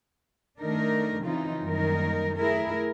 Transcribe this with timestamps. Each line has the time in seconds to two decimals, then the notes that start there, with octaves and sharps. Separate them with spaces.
0.60 D#3 A3 D4 D#4 A#4
1.23 C#3 E3 C4 D#4 F4
1.63 F#2 D#3 G3 A#3 D#4 A#4
2.37 A3 E4 G#4 A#4